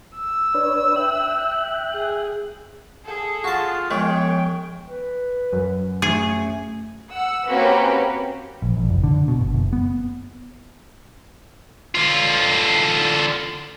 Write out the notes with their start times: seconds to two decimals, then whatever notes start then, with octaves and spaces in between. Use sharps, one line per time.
0.17 E6
0.54 D4 B4 C#5
0.96 E5 G5 F#6
1.93 G#4
3.05 G#4 A4
3.44 F4 F#4 A5
3.91 F3 G#3 B3 C#5 G5
4.88 B4
5.53 F#2
6.02 A3 G#4
7.11 F#5 E6
7.49 A#3 C4 C#4 F#4 G4 B4
8.62 A#1
8.77 A#1
8.89 F#1
9.04 D3
9.28 B2
9.40 G1
9.54 F#1
9.73 B3
11.95 D3 F4